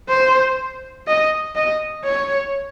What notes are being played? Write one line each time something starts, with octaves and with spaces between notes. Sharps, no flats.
C5
D#5
D#5
C#5